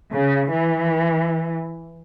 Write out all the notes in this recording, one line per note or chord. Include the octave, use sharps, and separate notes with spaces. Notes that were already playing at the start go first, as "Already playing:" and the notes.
C#3
E3